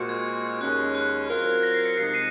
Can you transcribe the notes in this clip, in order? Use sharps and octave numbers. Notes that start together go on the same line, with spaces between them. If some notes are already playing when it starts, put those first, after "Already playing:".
Already playing: A#2 G#3 C4 F#4
G#6
D#2 C#3 G#3 C#4 F#6
F#6
F#3 C4 F4 A#4
A#6
C7
A#6 C#7
C3 F3 G#3 D#4 C7
C7 D#7